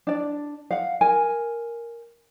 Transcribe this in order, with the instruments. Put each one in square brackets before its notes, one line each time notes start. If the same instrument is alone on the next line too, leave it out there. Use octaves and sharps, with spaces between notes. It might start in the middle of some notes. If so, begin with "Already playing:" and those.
[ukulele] D4 D5
F5 F#5
A#4 G#5